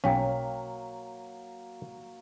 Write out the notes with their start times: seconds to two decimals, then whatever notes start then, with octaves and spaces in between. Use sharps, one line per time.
0.04 B1 F#3 A#3 C#4 F5 G5